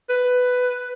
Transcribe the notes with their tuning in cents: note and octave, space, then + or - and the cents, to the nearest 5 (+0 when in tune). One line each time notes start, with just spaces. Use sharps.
B4 +10